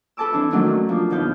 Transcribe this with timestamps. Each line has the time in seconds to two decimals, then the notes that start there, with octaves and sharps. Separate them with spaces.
0.17 A4 B4 A5 D6 E6
0.33 E3 C4 D4 E4
0.51 D#3 F#3 A3 A#3 C#4 D4
0.64 C#4 D4
0.89 F3 A#3
1.10 D#2 B2 D#4 F5 G6